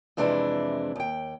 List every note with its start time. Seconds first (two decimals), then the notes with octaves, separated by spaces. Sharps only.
0.17 F2 C3 E3 G#3 D4 E4
0.96 D#2 G5